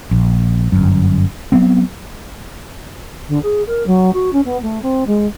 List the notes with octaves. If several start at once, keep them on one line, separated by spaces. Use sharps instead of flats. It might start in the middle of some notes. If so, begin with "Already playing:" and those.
A#1
G1 F#2
F#3 B3 C4
D3
G#4
A#4
F#3
F#4
C#4
B3
A3
C4
G#3